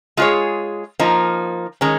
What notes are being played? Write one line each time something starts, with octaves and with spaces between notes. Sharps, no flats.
G#3 F4 G#4 C#5
F3 A#3 D#4
D#3 G#3 C#4